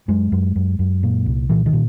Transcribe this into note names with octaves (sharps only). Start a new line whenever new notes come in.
F#2 G#3
F#2
F#2
F#2
A#2
C2
A#2 E3
D#3
A#2